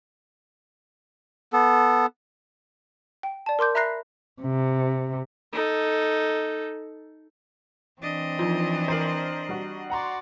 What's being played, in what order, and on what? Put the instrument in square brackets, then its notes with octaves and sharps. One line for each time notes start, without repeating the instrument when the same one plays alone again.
[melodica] B3 A4
[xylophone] G5
D5 A5
A#4 C6 D6 G6
E5 A#5 B5 F#6 A#6 C7
[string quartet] C3
[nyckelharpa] D#4 A4
[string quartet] E3 C4 [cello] D4 D#5
[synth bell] F3 D#4 F4 [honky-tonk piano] C5
[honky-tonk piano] A#4 C5 [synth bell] A#5 C7 F#7
[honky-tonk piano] G3 F#4
[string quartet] F#4 D5 [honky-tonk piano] F#5 A#5 C6